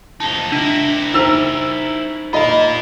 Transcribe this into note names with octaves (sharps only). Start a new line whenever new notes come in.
F2 D#4 A5
D4 E4 A#4
D#4 C5 A#5 E6
F4 A#4 D#5 B5